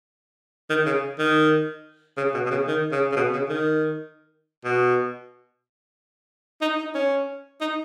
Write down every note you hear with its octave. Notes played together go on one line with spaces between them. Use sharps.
D#3
C#3
D#3
C#3
B2
B2
C#3
D#3
C#3
C#3
B2
C#3
D#3
B2
D#4
D#4
C#4
D#4